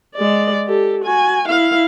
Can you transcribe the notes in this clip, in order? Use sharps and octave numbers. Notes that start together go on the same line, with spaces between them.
G#3 D5
G4 A4
F#4 G#5
E4 F5